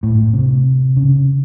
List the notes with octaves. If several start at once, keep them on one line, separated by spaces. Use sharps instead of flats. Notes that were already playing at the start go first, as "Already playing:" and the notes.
A2
C3
C#3